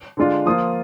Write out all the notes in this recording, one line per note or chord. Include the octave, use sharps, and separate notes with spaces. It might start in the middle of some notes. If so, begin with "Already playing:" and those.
D3 G#3 D4 F4
F3 A#3 F4 D#6